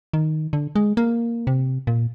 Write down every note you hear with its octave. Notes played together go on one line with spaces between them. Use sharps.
D#3
D3
G#3
A#3
C3
A#2